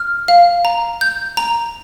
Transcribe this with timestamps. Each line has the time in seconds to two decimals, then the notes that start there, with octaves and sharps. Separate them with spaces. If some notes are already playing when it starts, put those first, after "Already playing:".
Already playing: F6
0.28 F5
0.65 A#5
1.01 G6
1.37 A#5